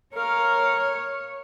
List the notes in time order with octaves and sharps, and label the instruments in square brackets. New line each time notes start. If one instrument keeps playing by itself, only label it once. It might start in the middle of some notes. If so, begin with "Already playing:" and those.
[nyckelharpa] A#4 F5 [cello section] C#5